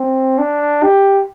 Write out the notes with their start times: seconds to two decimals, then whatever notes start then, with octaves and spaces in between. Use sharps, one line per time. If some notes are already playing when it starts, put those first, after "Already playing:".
Already playing: C4
0.38 D4
0.83 G4